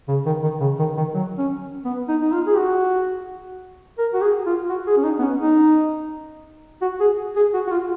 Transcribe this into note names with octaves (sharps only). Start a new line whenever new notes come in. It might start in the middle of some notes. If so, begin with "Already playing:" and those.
C#3
D#3
D#3
C#3
D#3
D#3
F#3
C#4
B3
D#4
D#4
F4
G#4
F#4
A#4
F#4
G#4
F4
F#4
G#4
C#4
D#4
B3
C#4
D#4
F#4
G#4
G#4
F#4
F#4
F4